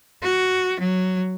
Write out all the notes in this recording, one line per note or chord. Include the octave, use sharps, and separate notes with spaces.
F#4
F#3